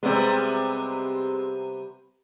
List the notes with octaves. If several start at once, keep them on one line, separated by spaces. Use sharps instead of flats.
C3 G3 G#3 B3 C4